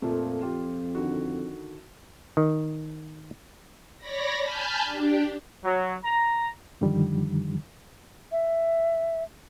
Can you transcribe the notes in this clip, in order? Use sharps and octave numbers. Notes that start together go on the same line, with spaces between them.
F2 A#2 F3 A3
F4 G4
D3 D#3 F#4
D#3
C#5 D5 B5 A#6
G#5 A5 B5 F6 G6
D4 G4
F#3
A#5
F#2 D3 D#3 F3 G3
E5